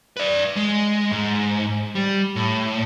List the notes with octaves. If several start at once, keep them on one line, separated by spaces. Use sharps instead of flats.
B4 D5
G#3
G#2
G3
A2